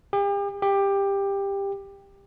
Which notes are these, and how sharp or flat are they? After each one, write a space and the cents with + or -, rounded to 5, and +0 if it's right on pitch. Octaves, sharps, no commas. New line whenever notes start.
G4 +40
G4 +15